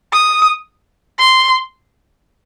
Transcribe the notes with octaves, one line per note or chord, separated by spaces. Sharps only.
D#6
C6